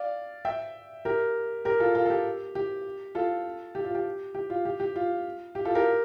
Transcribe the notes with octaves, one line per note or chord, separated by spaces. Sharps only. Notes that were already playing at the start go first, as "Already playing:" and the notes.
Already playing: D5 F5
E5 G5
G4 A#4
G4 A#4
F4 A4
F4 A4
A4
G4
G4
F4 A4
G4
F4
G4
G4
F4
G4
G4
F4
G4
F4 A4
G4 A#4